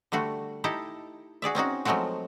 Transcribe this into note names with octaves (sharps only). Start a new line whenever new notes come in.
D3 G3 A3 F#4
D#4 E4 G4 A4
F#4 G#4 D5 E5
C4 C#4 D#4 F#4
F3 F#3 G#3 A3 C4 F#4